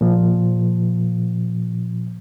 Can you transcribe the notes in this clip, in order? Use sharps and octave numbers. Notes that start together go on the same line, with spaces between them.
A#2 F3